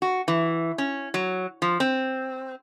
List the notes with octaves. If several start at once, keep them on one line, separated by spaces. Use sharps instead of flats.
F#4
E3
C#4
F#3
F3
C4